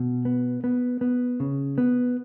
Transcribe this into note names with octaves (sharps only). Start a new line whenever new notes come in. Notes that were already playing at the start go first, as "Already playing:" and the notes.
Already playing: B2
B3
B3
B3
C#3
B3